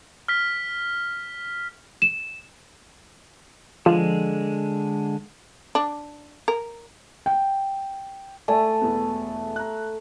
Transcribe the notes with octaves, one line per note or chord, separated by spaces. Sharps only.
F6 B6
E7
D3 F3 G#3
D4
A#4
G5
A3 D5 E5 G#5 A5
E1 E2 B3
A#5 F#6